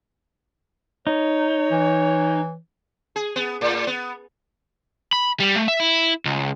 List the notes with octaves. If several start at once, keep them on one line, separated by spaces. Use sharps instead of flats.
D#4 C#5
E3
G#4
B3
A2
B3
B5
G3
A3
E5
E4
C#2